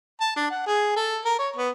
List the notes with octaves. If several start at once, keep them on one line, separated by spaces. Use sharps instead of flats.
A5
D4
F#5
G#4
A4
A#4
C#5
B3